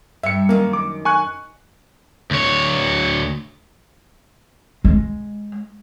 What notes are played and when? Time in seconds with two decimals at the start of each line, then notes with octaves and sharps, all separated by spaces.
0.23 G2 E5 C#7
0.49 F#2 D#3 A#3
0.73 D6
1.05 G#5 C#6 F#6
2.31 D2 C#5
4.84 G#3